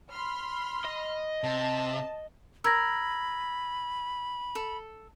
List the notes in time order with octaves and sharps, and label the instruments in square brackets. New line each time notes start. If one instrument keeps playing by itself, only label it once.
[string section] B5 C6 F6
[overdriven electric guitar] D#5
[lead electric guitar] C3 [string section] A5
[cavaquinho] A#4 [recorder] B5 [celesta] E6 G#6 A#6
[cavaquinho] A4